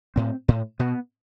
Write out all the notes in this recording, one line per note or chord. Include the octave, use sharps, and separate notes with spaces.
A2 C4
A2
B2 B3